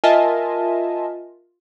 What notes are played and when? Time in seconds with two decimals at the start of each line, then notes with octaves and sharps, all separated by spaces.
0.04 F4 A#4 D#5 E5 G#5 A5